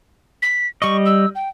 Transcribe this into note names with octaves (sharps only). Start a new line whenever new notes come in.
B6
G3 D#5 C#6
E6
G5